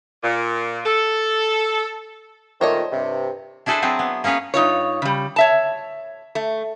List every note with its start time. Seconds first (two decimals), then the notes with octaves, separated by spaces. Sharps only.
0.23 A#2
0.85 A4
2.61 A#2 D#3 A3 C5 C#5 D#5
2.92 G2 C3
3.66 D4 E4 G#4 A4 B4 C5
3.82 F#3 C4 G#4
3.99 B3
4.24 A#3 C#4 G#4 B4 C#5
4.54 G2 D#4 F4 C#5
5.02 C#3 G3
5.36 C#5 E5 A5
6.35 A3